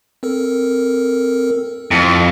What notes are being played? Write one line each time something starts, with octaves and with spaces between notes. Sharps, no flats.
C4 A4 A#4
F2 E4